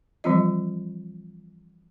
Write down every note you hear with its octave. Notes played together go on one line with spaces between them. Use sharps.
E3 F3 G3 C4 F4 D#5